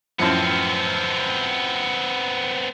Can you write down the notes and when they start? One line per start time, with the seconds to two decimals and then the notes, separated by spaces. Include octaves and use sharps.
0.19 F#2 A2 F3 B3 C4